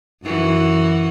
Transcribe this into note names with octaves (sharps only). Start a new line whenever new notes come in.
F#2 E3 F#4